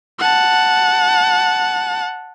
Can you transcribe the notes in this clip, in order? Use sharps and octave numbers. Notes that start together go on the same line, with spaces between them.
F#5 A5